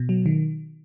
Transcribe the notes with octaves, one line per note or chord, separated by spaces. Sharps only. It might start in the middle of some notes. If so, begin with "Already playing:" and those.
Already playing: B2
F#3
D#3